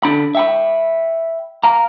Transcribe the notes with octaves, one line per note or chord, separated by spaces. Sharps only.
D3 D4 B5
E5 G5 B5
F5 A#5